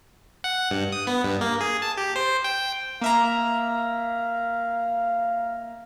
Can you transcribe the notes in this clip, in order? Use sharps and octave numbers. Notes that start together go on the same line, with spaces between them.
F#5
G2
D#6
B3
G2
A#3
G#4
A5
G4
C5
G5
A#3 E5 F5 A#5